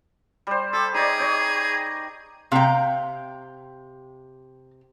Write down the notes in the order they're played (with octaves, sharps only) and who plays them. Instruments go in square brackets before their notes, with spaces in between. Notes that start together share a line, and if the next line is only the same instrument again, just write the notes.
[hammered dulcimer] G3 C5
[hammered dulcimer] G4 [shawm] A4
[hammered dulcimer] D#4 C#5 D5 [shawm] G#4
[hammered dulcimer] G4 C#5 D#5
[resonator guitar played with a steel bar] C3 G5 [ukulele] F5 A#5